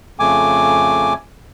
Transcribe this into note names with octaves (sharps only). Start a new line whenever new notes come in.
F2 C#3 A3 G#5 D6